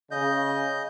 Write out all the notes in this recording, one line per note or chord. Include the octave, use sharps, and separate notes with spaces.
C#3 D#5 G6